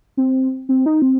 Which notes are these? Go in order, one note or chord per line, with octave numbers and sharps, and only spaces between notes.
C4
C4
D#4
C4